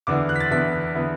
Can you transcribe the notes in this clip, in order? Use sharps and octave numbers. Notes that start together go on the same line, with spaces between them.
E2 D3 B3 E4 D6
F#6
B6
A6
E2 D3 B3 E4 B6
D3 B3 E4